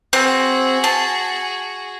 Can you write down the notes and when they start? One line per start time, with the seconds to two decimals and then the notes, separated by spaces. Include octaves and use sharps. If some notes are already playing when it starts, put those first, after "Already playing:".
0.13 C4 F#4 G#4
0.84 A5